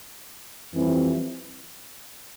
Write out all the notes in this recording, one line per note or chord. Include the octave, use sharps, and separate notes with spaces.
F2 E3 G3 C4 E4